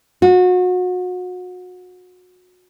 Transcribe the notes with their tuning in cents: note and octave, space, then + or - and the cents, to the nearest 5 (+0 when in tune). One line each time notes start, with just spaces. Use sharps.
F#4 -30